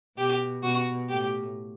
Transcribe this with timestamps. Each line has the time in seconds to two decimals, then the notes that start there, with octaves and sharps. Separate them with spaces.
0.17 B2 G4
0.63 B2 F#4
1.09 A2 G4